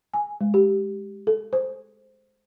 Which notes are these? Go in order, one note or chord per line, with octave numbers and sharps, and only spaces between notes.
G#5
G#3
G4
A4
C5